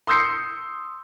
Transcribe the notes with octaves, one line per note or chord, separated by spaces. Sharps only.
C6 D#6 E6 G6 C7 C#7